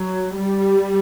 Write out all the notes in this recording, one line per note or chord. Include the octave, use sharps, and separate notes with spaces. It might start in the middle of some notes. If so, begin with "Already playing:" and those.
Already playing: F#3
G3